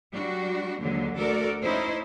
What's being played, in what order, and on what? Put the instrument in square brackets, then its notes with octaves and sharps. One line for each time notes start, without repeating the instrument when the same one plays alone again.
[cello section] F#3 G3 D4 F#4
D#2 D3 F#3 G#3 A#3
D2 F#4 A4 A#4 D5
C#4 D#4 E4 C5